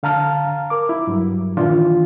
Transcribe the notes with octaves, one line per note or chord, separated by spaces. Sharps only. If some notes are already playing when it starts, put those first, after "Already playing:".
D3 F5 A5 A#5 F6
A#4 D6
E4
G2 F#3
A#2 D#3 E3 D4 F4